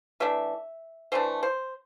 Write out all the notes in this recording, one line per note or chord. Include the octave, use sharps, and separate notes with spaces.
E3 A3 D4 E5
E3 A3 D4 C5
C5